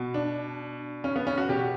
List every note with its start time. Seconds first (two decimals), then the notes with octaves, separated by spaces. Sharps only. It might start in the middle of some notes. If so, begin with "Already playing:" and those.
Already playing: B2
0.14 D4
1.04 C#4
1.16 B3
1.27 C#4
1.38 F#4
1.49 B2 G4